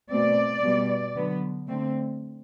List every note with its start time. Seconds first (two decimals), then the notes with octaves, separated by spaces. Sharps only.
0.11 B2 A3 C4 D5
0.64 B2 G3 B3
1.16 D3 F#3 B3
1.68 D3 A3 C4